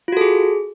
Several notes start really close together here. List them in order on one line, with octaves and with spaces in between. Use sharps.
F4 F#4 A4 G#4